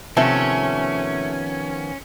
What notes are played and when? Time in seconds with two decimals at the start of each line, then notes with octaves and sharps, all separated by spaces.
0.17 C3 D#3 F3 A3 B3 C#4